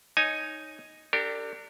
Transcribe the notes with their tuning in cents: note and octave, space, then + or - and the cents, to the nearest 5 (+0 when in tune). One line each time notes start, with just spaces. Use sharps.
D#4 +0 C#5 +0 G#5 +0
D4 +0 G4 +0 A#4 -45